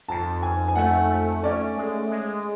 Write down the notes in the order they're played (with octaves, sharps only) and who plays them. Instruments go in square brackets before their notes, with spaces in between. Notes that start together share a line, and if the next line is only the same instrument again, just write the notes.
[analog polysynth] F2 [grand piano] A5
[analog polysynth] F2 [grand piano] G#5
[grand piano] G#5
[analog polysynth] A3 [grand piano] F#5
[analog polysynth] A3
[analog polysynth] C#4 [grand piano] D5
[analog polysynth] G#3
G#3